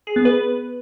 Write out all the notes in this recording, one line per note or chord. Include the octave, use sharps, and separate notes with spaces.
G#4
B3
B4